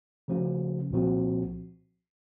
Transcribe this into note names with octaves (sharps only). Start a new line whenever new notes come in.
C#3 F3 A3 C#4 F#4
C2 A#2 F3 C4 F#4